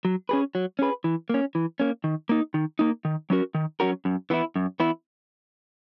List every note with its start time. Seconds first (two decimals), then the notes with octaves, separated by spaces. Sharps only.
0.05 F#3
0.29 C#4 G#4 B4
0.55 F#3
0.79 C#4 G#4 B4
1.04 E3
1.30 A#3 C#4
1.55 E3
1.80 A#3 C#4
2.04 D#3
2.29 A#3 D#4
2.54 D#3
2.79 A#3 D#4
3.05 D#3
3.30 F#3 C#4 F#4 A#4
3.55 D#3
3.80 F#3 C#4 F#4 A#4
4.05 F#2
4.30 E3 B3 E4
4.56 F#2
4.80 E3 B3 E4